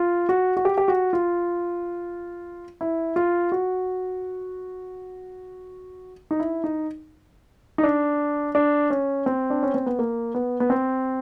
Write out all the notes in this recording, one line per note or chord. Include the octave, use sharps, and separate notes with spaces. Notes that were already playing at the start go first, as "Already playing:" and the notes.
Already playing: F4
F#4
F#4
G4
G4
F#4
F4
E4
F4
F#4
D#4
E4
D#4
D#4
D4
D4
C#4
C4
D4
C#4
C4
B3
A#3
B3
B3
C4